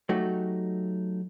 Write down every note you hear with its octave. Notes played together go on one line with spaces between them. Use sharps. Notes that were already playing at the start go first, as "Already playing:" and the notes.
F#3 A3 D#4 F#4 G4